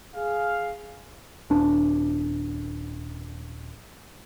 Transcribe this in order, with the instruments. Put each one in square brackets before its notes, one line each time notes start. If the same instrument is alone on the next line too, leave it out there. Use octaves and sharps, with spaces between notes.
[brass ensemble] G#4 F5
[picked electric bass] D#1 D4